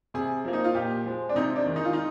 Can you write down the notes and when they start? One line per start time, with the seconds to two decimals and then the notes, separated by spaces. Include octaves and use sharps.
0.14 C3 G#4
0.45 F3 A#3
0.53 D#4
0.64 F4
0.75 A#2 G4
1.05 F3 G#3
1.29 D4
1.36 C3 D#4
1.56 D4
1.66 D#3 G#3
1.76 D#4
1.85 F4
1.93 D#4